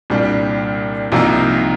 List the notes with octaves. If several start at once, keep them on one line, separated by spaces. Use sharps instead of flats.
C2 A#2 G3 D4 G4
C2 C3 F3 A#3 D#4